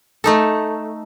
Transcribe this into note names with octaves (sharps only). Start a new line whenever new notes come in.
A3 D#4 A4